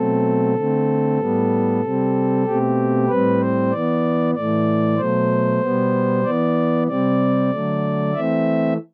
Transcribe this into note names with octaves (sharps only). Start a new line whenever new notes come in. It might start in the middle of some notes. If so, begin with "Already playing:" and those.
Already playing: B2 F#3 A3 C4 A4
D3 A3 C4
A2 G3 B3
C3 G3 C4
B2 A3 C4 G4
A2 G3 C4 B4
C5
E3 B3 D5
A2 E3 A3 D5
B2 F#3 A3 C5
B2 G3 B3
E3 B3 D5
C3 G3 C4 D5
D3 F#3 A3
E3 A3 C4 E5